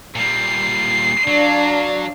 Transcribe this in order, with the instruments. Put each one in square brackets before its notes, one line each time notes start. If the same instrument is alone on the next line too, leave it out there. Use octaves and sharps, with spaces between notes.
[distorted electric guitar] A#2 G3 [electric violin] C7
[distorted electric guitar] F#3 [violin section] D4 F5 A5